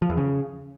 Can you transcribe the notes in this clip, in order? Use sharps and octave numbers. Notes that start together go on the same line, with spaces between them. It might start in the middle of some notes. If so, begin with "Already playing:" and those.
F3
E2
C#3